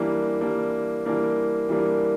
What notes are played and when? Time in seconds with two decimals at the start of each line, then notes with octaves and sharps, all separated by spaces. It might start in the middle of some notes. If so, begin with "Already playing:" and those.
Already playing: E3 G3 A#3 D4
0.41 E3 G3 A#3 D4
1.06 E3 G3 A#3 D4
1.69 E3 G3 A#3 D4